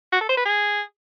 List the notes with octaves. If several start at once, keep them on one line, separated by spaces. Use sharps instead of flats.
F#4
A4
C5
B4
G#4